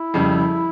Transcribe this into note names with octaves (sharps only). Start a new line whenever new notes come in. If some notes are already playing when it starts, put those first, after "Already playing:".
Already playing: E4
F2 C#3 G3